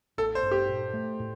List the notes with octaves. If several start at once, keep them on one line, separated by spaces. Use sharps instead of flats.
A1 A4
C5
G2
G4
A#2
A3
A2